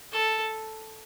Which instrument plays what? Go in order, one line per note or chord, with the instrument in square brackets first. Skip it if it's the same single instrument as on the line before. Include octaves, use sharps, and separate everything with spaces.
[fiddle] A4